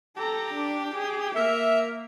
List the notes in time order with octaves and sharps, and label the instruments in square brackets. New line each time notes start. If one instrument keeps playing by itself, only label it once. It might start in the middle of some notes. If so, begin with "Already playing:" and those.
[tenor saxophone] G4 [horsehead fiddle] A4 A#5
[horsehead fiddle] D4
G#4
[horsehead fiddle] A#3 [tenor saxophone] A#4 [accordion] E5